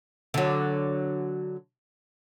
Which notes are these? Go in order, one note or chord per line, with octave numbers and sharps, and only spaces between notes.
D3 F#3